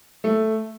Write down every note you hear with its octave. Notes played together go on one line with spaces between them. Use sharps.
A3